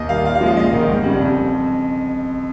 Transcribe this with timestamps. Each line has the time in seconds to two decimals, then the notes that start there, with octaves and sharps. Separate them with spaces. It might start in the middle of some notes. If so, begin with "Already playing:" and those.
Already playing: D#2 D#5
0.09 D#3 G3 F5
0.25 A#2 F5
0.35 F5
0.41 F3 G#3 C#4 D#5
0.57 A#1 D#5
0.72 G#2 D#3
0.88 G1
1.03 F2 C#3 G3
1.20 F2